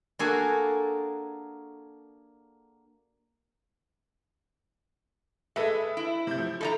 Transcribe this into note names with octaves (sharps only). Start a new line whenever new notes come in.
A#3 D4 F#4 G#4 A4 G#5
G#3 A4 B4 E5
E4
C3 G6
F3
A4 D#5 A#5 B5